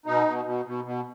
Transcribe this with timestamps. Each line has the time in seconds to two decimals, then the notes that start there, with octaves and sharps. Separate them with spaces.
0.06 B2 D#4
0.26 B2
0.45 B2
0.65 B2
0.84 B2